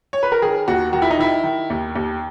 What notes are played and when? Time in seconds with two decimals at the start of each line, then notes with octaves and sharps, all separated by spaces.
0.13 C#5
0.23 B4
0.32 A#4
0.42 D#3 G#4
0.68 D#2 F#4
0.93 D#3 F#4
1.02 E4
1.10 D#4
1.19 D#3 E4
1.44 D#3
1.70 D#2
1.96 D#2